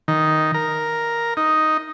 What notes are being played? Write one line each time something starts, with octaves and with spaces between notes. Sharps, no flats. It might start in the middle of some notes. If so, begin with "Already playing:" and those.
D#3
A#4
D#4